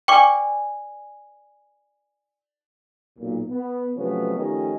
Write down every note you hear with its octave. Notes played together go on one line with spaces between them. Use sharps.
B4 D5 G5 G#5 C#6 D6
B1 A#2
B3
C3 F3 F#3 A3 B3 C#4
D#3 F3 A3 C#4 G4 D#5